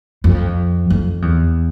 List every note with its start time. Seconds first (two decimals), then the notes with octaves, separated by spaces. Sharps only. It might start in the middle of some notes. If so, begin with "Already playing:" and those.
0.24 F2
0.90 F2
1.22 E2